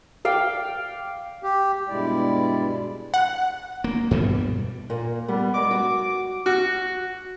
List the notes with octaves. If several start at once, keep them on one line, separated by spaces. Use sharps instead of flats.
D5 F5 G5
G4
G2 B2 G3 G#3 E4 D5
F#5
A#3
G2 B2 G3
A#2 A#3
G3 B3
G#3 A#4 D6
F#4
F#4